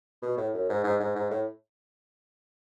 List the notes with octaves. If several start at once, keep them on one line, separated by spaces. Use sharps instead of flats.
B2
A2
F#2
G#2
G#2
G#2
G#2
A2